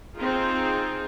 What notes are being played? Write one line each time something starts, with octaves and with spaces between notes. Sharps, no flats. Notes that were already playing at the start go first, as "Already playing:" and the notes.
C4 D#4 F4 G#4